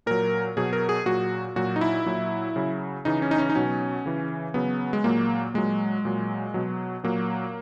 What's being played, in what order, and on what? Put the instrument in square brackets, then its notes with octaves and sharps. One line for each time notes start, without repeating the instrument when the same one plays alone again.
[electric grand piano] A#2 F#3 A#4
B2 F#3 G#4
A#4
G#4
A#2 F#3 F#4
A#2 F#3 F#4
D#4
E4
A#2 F#3
C#3 F#3
C#3 E3 D#4
C#4
D#4
C#4
D#4
B2 F#3 C#4
C#3 E3
C#3 F#3 B3
G#3
A#2 F#3 A#3
A#2 F#3 G#3
A#2 F#3
B2 F#3
A#2 F#3 A#3